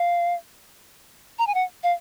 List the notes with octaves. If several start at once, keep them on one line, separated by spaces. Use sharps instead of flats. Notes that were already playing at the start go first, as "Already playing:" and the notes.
Already playing: F5
A#5
G#5
F#5
F5